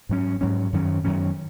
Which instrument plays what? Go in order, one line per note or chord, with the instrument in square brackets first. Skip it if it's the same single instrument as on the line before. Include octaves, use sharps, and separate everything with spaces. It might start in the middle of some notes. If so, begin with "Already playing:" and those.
[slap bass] G#2 F#3 C#4
G#2 F#3 C#4
F#2 D#3 F#3 C#4
F#2 D#3 F#3 C#4